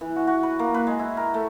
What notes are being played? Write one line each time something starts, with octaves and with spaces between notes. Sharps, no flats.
E3
F#4
F#4
B4
A#3
B4
G#3
E4
A#4
A3